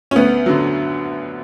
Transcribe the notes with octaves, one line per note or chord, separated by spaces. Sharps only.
C#4
D2 B3
D3 F#3